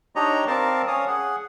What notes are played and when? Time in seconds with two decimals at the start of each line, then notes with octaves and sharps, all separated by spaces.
0.16 D4 D#4 G4 C#5 D#5 A#5
0.47 C4 A#4 D5 F5 A5
0.87 C#4 C#5 F5 D#6
1.07 G#4 F#5